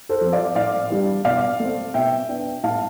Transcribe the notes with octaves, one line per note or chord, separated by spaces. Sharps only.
A4 C5
F3 C4
D5 F5
A2 D5 F5
E3 G3 D4
B2 D5 F5
A3 C4
B2 E5 G5
B3 D4
A2 F5 A5